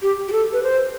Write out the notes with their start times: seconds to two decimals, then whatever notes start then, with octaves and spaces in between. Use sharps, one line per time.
0.02 G4
0.28 G4
0.32 A4
0.53 B4
0.63 C5